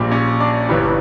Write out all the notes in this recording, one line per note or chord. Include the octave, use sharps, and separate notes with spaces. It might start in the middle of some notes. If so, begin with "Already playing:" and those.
Already playing: A#1 A#2 G3
C#4 C#5
D4 D5
G1 G2 E3 G3 C#4 C#5